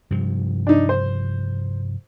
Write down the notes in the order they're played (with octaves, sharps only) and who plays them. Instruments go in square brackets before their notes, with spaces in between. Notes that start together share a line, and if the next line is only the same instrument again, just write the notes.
[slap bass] G2 C3 F3
[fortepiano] D4 D#4
C5